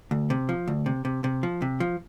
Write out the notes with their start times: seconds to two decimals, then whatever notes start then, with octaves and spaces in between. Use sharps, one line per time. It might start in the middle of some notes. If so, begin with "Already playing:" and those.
0.11 D2
0.30 C3
0.49 F3
0.68 D2
0.86 C3
1.05 C3
1.24 C3
1.43 F3
1.62 C3
1.80 F3